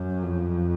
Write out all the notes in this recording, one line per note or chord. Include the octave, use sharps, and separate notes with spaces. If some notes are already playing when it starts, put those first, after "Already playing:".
Already playing: F#2
F2